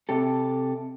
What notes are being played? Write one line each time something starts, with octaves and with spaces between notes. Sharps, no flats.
C3 G4 A4